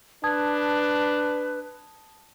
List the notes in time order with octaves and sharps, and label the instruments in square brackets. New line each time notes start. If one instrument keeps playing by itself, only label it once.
[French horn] D4 [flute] B4 [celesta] A5 D#6 G#6